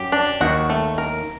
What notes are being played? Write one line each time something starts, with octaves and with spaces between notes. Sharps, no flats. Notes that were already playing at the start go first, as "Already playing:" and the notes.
Already playing: F#2 F#3 G4
D4
D#2 D#3 F#4
A3
A#4